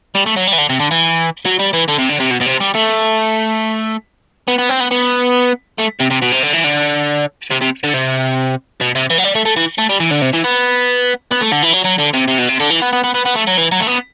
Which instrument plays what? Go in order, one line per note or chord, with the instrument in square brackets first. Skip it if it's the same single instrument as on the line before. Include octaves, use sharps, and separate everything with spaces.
[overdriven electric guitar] G3
A3
F#3
G3
E3
D3
C3
D3
E3
F#3
G3
E3
D3
C3
D3
C3
B2
B2
C3
G3
A3
B3
B3
C4
B3
B3
A3
C3
C3
B2
C3
D3
E3
D3
C3
C3
D3
C3
B2
C3
E3
F#3
G3
A3
A3
E3
A3
G3
E3
D3
C3
E3
B3
B3
A3
D3
E3
F#3
F#3
D3
C3
C3
B2
C3
D3
E3
B3
B3
B3
B3
B3
A3
F#3
E3
F#3
A3
B3